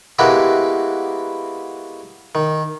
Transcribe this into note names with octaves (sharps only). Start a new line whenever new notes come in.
G#3 A#3 B3 E4 F#4 G4
D#3